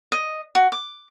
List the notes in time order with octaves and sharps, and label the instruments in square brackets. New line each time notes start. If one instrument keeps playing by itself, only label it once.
[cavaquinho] D#5
F#4
D6